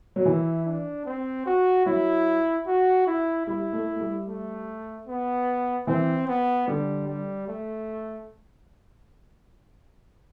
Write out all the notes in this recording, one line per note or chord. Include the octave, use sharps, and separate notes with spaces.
F#3
E3 E4
D4
C4
F#4
F#3 E4
F#4
E4
G3 E4
A3
A3
G3
A3
B3
E3 C4
B3
D3 G3
G3
A3